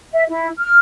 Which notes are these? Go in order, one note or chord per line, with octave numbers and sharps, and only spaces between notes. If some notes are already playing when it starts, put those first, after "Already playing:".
E5
E4
F6